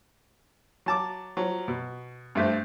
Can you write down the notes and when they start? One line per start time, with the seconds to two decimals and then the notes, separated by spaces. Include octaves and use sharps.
0.86 F#3 A5 D6
1.37 F3 F#3
1.68 B2
2.35 G2 A3 C5